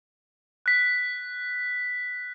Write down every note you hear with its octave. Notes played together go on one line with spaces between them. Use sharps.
F#6 B6